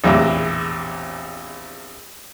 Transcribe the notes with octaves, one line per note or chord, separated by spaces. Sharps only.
A#1 E2 A2 C3